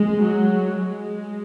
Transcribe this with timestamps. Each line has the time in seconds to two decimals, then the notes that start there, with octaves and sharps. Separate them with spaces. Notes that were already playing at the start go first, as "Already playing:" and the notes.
Already playing: G#3
0.23 F#3
0.77 G#3